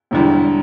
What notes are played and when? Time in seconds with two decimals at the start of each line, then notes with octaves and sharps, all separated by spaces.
0.11 E1 E2 D3 G3 D4